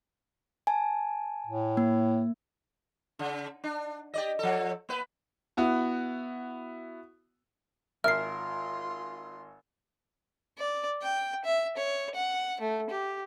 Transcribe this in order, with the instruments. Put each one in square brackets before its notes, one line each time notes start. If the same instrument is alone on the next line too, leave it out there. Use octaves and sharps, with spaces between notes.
[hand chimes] G#5 A5
[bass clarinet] A2
[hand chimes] A#3
[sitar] C#3
D4
G4 D5 D#5
F3 A4
A#3 B4
[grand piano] B3 E4 F#4
[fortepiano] G#1 A#4 [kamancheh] F4 C6 [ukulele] E5 [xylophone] F6 C7
[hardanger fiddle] D5
G5
E5
C#5
F#5
A3
G4